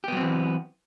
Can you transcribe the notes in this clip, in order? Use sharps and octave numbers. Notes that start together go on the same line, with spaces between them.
E3 F#3 B3 C4 G4